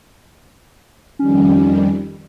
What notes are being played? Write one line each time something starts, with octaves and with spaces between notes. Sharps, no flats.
F2 D#3 G3 C#4